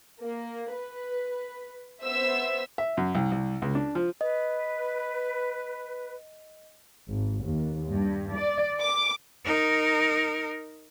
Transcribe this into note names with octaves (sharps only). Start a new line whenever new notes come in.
A#3
B4
B3 C5 E5 E6
E5
F#2
C2
C2
C#2
D4
F3
B4 D#5
G#1
D#2
G2
D5
D6
D#4 A#4